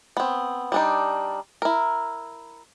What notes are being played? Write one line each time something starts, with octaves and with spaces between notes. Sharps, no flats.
B3 C4
G3 D4 D#4
E4 A#4